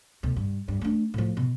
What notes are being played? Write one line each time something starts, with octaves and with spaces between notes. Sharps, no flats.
D2 B2
G2
G2
A3 D4
A2 F3
B2